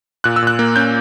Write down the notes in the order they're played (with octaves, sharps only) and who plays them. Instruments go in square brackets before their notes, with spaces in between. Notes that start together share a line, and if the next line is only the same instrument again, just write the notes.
[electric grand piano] A#2 F#6
E6
A#2 F#6
A#3
C#4 G6